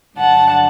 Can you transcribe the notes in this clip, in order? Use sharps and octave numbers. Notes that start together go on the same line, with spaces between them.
G2 D3 F#3 F#5 A5